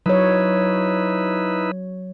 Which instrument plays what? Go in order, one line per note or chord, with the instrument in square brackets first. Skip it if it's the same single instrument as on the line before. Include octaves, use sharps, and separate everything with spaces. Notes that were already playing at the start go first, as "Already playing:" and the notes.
[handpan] F#3 C#5 [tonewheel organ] D#4 E4 B4